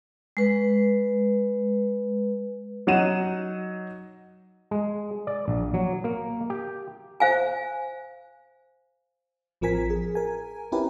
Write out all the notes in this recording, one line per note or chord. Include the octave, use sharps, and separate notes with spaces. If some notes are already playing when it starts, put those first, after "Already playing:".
G#3 B4
F#3 D#4 F#5 D#7 E7
G#3
D5
A#1
F#3
A#3
G4
C5 F5 G#5
A1 F3 C4 A#4 G#5 B6
G#4
A#4 G#5
C4 C#4 E4 G4 A#4 B4